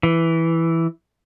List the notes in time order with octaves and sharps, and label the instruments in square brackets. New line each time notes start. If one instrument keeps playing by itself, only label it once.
[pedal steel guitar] E3